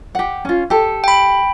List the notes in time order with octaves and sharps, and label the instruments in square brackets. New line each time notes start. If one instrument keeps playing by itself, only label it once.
[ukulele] G4 F#5
C#4 F4
G4 A4
[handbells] G5 B5